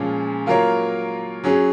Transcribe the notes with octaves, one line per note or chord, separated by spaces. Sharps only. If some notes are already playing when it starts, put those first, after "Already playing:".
Already playing: A#2 F3 G#3 C#4 F4
F#3 A#3 F4 A#4 C#5
F#3 C#4 G#4